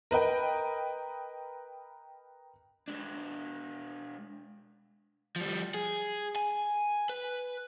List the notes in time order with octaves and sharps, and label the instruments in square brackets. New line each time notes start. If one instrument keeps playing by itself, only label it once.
[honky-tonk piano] A#4 B4 D#5 G5
[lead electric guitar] G#3 D4
[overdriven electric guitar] F3 G3
G#4
G#5
B4